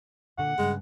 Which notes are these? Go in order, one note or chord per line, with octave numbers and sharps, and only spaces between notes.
A#2 D3 F#5
G2 C#3 G#3